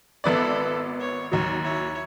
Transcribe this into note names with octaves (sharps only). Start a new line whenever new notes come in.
G#1 B3 E4 A4 D5
C#5
D#2 F#3 C#5
E4 C#5